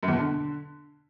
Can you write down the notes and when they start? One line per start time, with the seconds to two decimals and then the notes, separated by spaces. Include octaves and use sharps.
0.03 F#2
0.08 E2
0.13 B2
0.18 D3